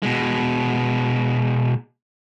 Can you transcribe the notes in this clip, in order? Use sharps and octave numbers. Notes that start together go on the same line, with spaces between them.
B2 G#3